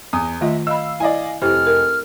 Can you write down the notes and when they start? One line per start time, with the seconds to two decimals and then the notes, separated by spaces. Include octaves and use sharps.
0.13 E2 D#6
0.41 D#3 A3 F4 D#5 E5
0.67 D#5 F5 B5 E6
1.00 E4 D5 D#5 G#5
1.42 F1 E4 G4 C5 F6
1.67 A#4